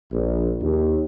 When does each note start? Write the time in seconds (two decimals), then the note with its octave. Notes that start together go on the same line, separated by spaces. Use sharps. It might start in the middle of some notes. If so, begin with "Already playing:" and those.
0.12 A#1
0.61 D#2